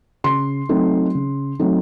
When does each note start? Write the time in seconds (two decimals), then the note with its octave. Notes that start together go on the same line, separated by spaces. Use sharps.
0.24 C#3 C6
0.69 F#3 A3 C4 D#4
1.15 C#3
1.59 F#3 A3 C4 D#4